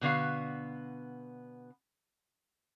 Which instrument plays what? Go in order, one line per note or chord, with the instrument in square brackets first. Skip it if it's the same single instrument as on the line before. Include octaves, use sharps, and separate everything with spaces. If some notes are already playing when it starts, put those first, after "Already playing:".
[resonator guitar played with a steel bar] B2 D3 B3 F#4 F5